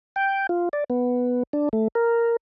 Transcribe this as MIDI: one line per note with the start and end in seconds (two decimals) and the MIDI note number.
0.16 0.47 79
0.49 0.69 65
0.73 0.84 74
0.90 1.43 59
1.53 1.69 62
1.73 1.88 57
1.95 2.36 70